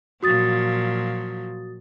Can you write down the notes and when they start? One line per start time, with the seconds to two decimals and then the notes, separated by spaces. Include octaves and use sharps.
0.23 A#2 F3 F#3 F#4 D#6 A6